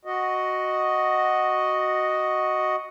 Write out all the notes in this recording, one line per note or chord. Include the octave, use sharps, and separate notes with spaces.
F#4 D#5